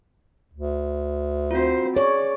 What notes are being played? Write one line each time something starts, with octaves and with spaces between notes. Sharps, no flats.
D2
C4 F4 F#4 C5
G#4 C#5 D5